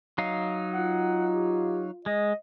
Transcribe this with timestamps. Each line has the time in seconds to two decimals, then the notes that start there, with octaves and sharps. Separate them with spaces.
0.18 F#3 D#4 F5
0.74 F4 F#5
1.31 G4
2.06 G#3 D#5